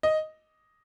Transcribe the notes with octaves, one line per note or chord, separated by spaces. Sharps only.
D#5